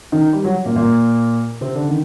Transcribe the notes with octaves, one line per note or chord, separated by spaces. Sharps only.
D#3 D#4
G3
F#3
A#2 A#3
A#2 A#3
C3 C4
D3 D4
D#3